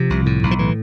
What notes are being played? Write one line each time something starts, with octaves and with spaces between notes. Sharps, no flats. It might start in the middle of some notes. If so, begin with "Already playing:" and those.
Already playing: C3 F3
C2
A2
B1
F3
A2 E3